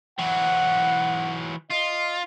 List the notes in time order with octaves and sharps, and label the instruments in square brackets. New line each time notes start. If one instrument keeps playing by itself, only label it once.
[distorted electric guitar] E3 F#3 [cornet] F#5
[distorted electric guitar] F4 [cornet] D#5